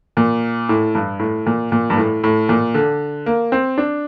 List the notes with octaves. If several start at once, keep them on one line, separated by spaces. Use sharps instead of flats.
A#2
A2
G2
A2
A#2
A#2
G2
A2
A2
A#2
D3
A#3
C4
D4